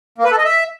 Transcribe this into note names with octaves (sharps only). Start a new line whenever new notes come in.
A#3
B4
A4
D#5
E5